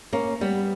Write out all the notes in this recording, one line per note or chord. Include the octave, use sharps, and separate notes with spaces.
A#3 C#4
G3 B3